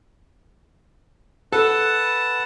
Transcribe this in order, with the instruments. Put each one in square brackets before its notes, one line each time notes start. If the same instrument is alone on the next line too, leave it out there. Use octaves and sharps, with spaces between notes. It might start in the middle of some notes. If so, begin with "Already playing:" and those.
[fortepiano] A4 [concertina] B4 F#5 A5